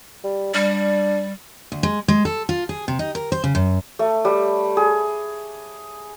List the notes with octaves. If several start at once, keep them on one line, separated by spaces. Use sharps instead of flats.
G3
G3 D4
D2
G#3
G#3
A4
F4
G#4
C3
D#4
A#4
C5
C#3
F#2
A3
G3
G#4